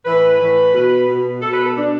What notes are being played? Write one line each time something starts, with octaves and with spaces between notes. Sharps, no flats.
A2 E3 B4
A2 E3
B2
B2
B2 A4
B4
A4
B2 D4